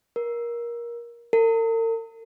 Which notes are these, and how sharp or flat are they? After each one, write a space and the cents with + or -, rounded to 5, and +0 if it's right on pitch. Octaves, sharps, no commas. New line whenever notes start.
A#4 +20
A#4 -45